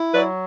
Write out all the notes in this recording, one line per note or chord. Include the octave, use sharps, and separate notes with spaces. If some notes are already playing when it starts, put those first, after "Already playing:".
Already playing: E4
F#3 B4 D5